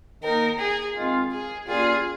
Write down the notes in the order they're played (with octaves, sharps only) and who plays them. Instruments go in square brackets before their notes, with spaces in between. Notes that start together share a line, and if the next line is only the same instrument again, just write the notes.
[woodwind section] D#3 A#3 D#4 [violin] A#4
[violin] G#4
[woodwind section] D#3 G#3 C4 F4
[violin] G#4
[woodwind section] A#2 G3 A#3 C#4 F4 [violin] G#4